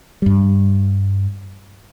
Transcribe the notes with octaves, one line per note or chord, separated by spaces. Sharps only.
G2 G3